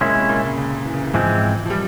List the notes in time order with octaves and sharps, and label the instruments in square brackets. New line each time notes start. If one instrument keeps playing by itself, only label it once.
[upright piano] A#2 [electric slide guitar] G#3 C#4 E4
[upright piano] C3
A#2
C#3
C#3
E3
C#3
E3
[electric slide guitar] G#2 E3 G#3 C4 [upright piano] F3
[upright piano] F3
G3